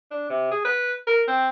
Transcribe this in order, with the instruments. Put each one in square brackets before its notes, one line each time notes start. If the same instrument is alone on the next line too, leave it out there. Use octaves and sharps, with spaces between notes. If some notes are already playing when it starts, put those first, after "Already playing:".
[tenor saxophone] D4
C3
G#4
B4
A#4
C4